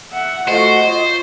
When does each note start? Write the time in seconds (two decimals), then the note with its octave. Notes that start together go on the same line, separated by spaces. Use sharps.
0.13 E5 F#5
0.48 A3 F#4 C5 D#5
0.84 F4 C#5